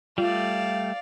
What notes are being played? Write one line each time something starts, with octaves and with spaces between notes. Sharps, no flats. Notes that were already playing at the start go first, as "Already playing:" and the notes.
G3 A3 F4 D5 F5